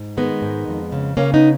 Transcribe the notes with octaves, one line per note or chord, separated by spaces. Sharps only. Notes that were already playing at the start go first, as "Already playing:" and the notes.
Already playing: G#2
D#3 G#3 B3
G#2
F2
C#3
C#3 A#3 C#4
B3 D#4